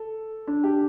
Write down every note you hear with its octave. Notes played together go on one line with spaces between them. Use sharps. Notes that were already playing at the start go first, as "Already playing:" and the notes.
Already playing: A4
D4
G4